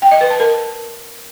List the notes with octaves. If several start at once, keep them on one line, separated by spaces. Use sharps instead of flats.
G5
D#5
B4
A5
A#4